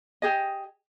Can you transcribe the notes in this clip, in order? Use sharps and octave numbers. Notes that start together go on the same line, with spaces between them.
G4 G#4 D#5